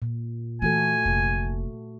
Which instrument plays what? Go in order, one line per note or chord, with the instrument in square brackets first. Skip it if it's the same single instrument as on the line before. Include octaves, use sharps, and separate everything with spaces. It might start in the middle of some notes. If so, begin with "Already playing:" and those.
[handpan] A#2
[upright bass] E3 [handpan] A3 F#4 A4 [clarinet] G#5
[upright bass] F1 A#2